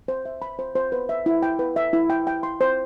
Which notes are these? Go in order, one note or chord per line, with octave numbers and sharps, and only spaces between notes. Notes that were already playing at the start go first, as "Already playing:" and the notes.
C5
E5
B5
C5
C5
B4
E5
E4
G5
B4
E5
E4
G5
G5
C6
C5